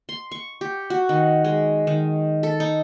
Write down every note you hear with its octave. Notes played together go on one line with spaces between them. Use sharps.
C6
C#6
G4
F#4
D#3
G#3
D#3
A4
D#4